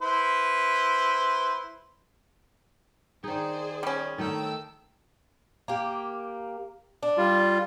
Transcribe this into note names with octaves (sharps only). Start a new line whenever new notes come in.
E4 B4 C5
D#3 D#4 G#4 C5 D5
G3 C#4
D#3 A3 D#4 A4 G5 E6
A#3 G4
D4
G3 F4